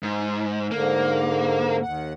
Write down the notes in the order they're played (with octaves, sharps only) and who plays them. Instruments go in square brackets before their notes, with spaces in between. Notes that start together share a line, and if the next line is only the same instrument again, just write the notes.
[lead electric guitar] G#2
[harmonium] G#2 D3 [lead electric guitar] A#3
[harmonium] D#2 F#5